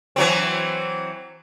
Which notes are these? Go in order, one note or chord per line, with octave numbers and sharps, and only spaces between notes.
E3 F#3 C4